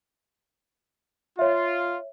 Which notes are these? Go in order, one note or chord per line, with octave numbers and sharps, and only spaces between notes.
F4 C#5 E5